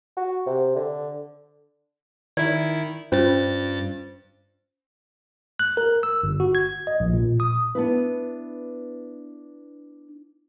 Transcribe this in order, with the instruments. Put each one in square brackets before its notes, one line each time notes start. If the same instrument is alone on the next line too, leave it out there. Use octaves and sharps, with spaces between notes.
[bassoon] F#4
C3
D3
[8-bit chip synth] D#3 E4 [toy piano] D5
[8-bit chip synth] G2 A6 [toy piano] C#4 F4 C5
[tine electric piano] F#6
A#4
E6
G1
F#4
G#6
D#5
A#1
A#2
D#6
[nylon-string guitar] B3 D4 E4 B4